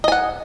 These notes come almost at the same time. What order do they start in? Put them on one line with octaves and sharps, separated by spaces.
D#5 G#5 F#5